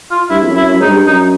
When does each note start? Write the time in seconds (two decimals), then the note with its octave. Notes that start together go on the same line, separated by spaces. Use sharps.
0.11 F4
0.30 G2 E4
0.43 F2
0.49 F#2
0.56 E4
0.68 F#2
0.80 G#2 D#4
0.88 G2
1.07 F#2 D#4